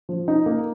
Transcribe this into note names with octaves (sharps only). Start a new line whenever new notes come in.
F3
D#4
A#3